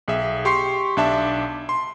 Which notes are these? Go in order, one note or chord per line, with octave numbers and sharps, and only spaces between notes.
B1 G#4 E5
G4 C6 C#6 C7
B1 D4 E5 A5 D6
C6